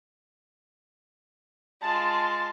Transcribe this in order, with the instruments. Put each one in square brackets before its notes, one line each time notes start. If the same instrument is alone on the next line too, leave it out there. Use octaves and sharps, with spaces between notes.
[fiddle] G#3 F4 [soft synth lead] A5